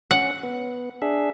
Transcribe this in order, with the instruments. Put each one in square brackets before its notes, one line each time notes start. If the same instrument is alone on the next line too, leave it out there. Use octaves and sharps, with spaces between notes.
[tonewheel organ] C#4 [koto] F#5
[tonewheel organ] B3
D4 G#4 E5